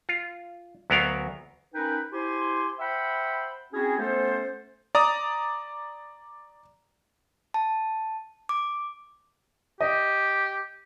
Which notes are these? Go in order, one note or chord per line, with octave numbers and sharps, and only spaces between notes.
F4
D2 F#3 B3 A#4 F5
C#4 D#4 A#4 B4 G5 B5
E4 G4 C5 G#5 C6
C5 E5 F#5 G5 B5
C4 C#4 E4 F#4 G#4
A3 B3 C#4 A4 C5
D5 A#5 D#6
A5
D6
G4 D#5